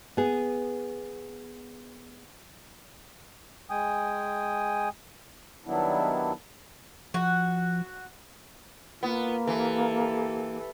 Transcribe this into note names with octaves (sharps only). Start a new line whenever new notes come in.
B3 G#4
G#3 G5 G#5 D#6
D#3 F#3 G3 B3 D4 E4
F3 F#4
A#3 B3 F4
E3 G4 A4